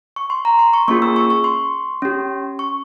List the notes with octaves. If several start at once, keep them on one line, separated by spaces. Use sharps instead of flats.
C#6
C6
A#5
C6
C#6
A#3 C#4 F4 G#4 C#6
E6
C#6
C#6
C6
C#4 G4
C#6